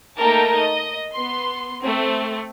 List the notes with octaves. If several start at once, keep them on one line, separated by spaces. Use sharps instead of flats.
A3 A#3 D#4 A#4 G5 A5
D#5
B3 C6
A3 C4